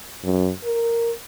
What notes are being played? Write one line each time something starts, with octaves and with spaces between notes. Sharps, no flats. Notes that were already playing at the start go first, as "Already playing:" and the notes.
F#2
A#4